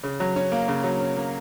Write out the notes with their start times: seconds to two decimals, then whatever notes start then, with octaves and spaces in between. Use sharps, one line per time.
0.03 C#3
0.20 F#3
0.36 C#4
0.52 A#3
0.68 C#3
0.84 F#3
1.00 C#4
1.17 A#3